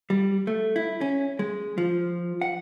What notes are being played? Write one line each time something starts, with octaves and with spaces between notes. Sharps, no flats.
G3
A3
E4
C#4
G#3
F3
F#5